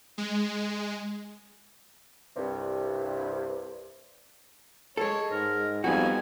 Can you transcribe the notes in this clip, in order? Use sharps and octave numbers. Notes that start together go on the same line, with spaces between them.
G#3
C2 G2 C3
G#3 A4 C#5
G#2 A#4
F2 G3 B3 D#4 F#4 G#5